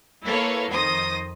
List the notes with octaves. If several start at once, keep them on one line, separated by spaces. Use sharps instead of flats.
A#3 E4 A4 B4 C#5 F5
F2 D#3 C5 D#6 A#6